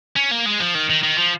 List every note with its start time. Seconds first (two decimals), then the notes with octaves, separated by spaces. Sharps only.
0.16 C#4
0.31 A#3
0.46 G#3
0.60 F3
0.75 D#3
0.90 D#3
1.03 D#3
1.18 F3